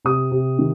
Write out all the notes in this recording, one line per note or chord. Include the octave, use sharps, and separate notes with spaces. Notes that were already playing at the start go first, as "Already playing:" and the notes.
C3 D#6
C3
D#3